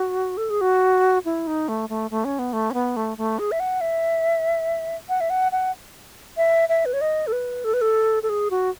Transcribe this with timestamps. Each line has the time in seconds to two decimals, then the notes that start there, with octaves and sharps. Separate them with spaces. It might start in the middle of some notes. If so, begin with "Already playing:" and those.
Already playing: F#4
0.37 A4
0.50 G#4
0.61 F#4
1.25 E4
1.47 D#4
1.68 A3
1.89 A3
2.11 A3
2.25 C#4
2.39 B3
2.53 A3
2.71 C#4
2.74 B3
2.96 A3
3.18 A3
3.39 G#4
3.52 E5
3.60 F#5
3.81 E5
5.09 F#5
5.21 E5
5.30 F#5
5.52 F#5
6.37 E5
6.69 E5
6.86 B4
6.93 C#5
7.01 D#5
7.27 A4
7.32 B4
7.64 A4
7.74 B4
7.81 A4
8.23 A4
8.29 G#4
8.51 F#4